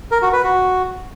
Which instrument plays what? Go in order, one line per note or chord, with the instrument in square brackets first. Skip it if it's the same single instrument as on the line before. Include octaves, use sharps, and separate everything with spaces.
[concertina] A#4
F#4
B4
F#4